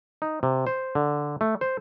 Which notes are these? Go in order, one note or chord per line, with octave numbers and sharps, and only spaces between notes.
D#4
C3
C5
D3
A3
C5